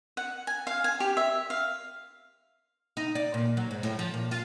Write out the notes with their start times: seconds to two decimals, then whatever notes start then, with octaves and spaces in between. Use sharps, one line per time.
0.17 F#5
0.47 G#5
0.67 F5
0.84 G#5
1.00 G4
1.17 E5
1.50 F5
2.97 D#4
3.15 D5
3.34 A#2
3.57 F#3
3.71 G#2
3.83 A2
3.99 F3
4.14 A#2
4.31 F4